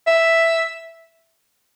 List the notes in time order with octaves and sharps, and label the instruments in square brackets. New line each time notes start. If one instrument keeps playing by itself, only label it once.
[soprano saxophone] E5